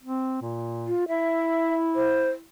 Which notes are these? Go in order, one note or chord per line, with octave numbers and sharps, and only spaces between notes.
C4
A#2
F4
E4 E5
C5